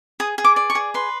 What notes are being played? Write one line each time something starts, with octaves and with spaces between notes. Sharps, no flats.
G#4 D#6
G#4
D6
D5
C#6
G#4
B4 C6